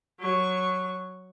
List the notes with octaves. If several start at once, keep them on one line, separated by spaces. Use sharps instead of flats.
F#3 C#6